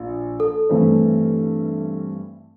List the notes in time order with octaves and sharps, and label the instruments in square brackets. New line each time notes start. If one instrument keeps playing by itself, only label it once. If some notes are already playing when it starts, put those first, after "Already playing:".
Already playing: [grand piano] A#1
[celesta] A4
[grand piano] G2 E3 A3 C4